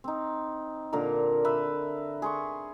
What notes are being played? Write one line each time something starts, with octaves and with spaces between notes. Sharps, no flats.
C4 D#4
A#2 D3 A#3 A#4
A#4 B4 E5
G#4 C6 C#6